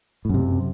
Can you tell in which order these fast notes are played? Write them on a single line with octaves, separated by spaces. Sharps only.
A2 F#2 C3